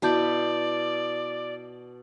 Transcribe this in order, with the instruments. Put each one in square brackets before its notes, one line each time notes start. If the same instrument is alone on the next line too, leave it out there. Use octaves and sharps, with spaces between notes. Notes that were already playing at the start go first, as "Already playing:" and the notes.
[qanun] B2 E4 D6 [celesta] F#4 A5 G6 [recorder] D5